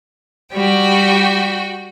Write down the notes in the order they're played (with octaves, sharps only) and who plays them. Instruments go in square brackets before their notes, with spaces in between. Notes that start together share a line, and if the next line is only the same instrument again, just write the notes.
[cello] G3 [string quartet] F#4 G5